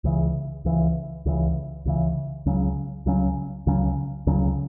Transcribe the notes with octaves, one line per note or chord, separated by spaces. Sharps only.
C#2 C#3 E3
C#2 C#3 E3
C#2 C#3 E3
C#2 C#3 E3
C#2 C#3 F#3 C#4
C#2 C#3 F#3 C#4
C#2 C#3 F#3 C#4
C#2 C#3 F#3 C#4